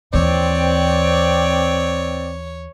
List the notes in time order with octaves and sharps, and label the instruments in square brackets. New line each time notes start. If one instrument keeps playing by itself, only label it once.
[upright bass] D#2 E3 [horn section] C4 D5 [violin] C#5